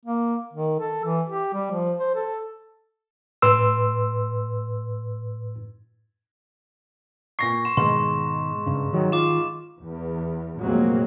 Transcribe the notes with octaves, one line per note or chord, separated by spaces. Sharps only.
A#3
D#3
A4
E3
G4
G3
F3
C5
A4
A2 B4 C6 E6
A#2 C#6 A#6 C7
C6 E7
G#2 B2 D#3 G#3 C6
G2 C#3
D#3 F#3
F4 D6 E7
E2
F1 A#2 F#3 G#3 A#3 C4